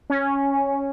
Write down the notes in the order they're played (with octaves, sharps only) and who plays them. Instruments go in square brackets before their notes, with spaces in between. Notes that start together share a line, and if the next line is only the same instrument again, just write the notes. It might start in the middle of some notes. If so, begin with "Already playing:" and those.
[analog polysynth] C#4